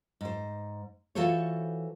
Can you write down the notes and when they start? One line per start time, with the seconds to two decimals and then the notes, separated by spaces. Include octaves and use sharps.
0.21 G#2 C5
1.15 E3 F4 F#4 A4 C5 C#5